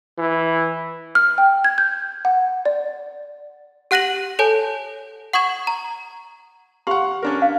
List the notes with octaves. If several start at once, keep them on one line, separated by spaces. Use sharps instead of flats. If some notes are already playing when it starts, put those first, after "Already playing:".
E3
F6
G5
G#6
G6
F#5
D5
G4 F#5 F#6 A#6 D#7 F#7
A4 C#5 G#5 A5 G6
F#5 C#6 D#6 G#6 E7
A#5
G4 F5 F#5 C6
C#4 D4 A#4
F5